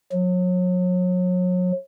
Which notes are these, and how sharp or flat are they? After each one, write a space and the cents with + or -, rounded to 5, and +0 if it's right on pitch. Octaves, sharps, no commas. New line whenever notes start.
F#3 -35